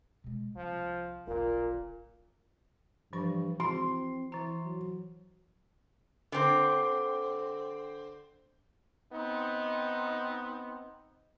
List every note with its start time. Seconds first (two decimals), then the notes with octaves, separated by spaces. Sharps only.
0.24 B2 G#3
0.56 C2 F3
1.27 D1 A1 A#2 F4 A#4
3.13 G2 E3 F3 C#6
3.60 C4 E4 F#4 C6
4.32 E3 E4 A#5
4.64 F#3
6.32 D3 C4
9.12 B3 C4 D#4